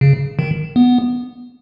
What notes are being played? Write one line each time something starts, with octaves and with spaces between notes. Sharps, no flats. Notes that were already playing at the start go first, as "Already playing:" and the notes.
C#3
D#3
B3